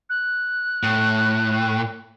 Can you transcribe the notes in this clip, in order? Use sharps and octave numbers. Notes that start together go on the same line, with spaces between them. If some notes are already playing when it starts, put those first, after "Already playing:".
F#6
A2